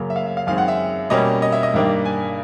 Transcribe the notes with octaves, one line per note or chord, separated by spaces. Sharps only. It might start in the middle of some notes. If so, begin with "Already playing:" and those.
Already playing: F#2 C#3 F#3 A#3
E5
F5
E5
F5
F#2 D#3 G#3 C4 F5
F#5
E5
B2 G3 A#3 C#4 D#5
D#5
E5
D#5
G2 D#3 G3 A#3 D4
G#5